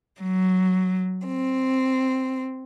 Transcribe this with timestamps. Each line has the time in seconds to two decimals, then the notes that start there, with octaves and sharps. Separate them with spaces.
0.20 F#3
1.27 C4